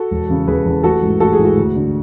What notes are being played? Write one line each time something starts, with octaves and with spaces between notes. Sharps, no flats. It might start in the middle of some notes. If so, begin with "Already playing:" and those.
Already playing: F#4 A4
E1
E2 C#3
E1 G#4 B4
E2 C#3
A1 F#4 A4
G#2 E3
A1 F#4 A4
G#4
G#2 E3
F#4
D2
D3